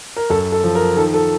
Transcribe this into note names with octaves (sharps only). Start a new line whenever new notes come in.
A#4
F#2 A4
A4
F3
A#4
D#3 A4
A4